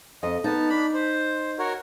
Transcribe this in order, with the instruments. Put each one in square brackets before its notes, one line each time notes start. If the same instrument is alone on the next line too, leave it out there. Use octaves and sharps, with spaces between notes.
[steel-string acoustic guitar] F2 [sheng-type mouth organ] D#5
[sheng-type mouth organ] B3 A5 [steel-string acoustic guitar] D#4
[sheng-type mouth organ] D4 B5
C5
F#4 A#4 C#5